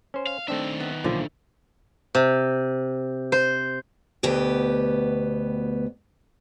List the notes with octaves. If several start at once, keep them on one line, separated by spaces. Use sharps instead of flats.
C#4 C5
F5
D#3 A3 C4 D4 E5
B3
B1 A#2 D3 F3
C3
C5
D2 B2 B3 G4 G5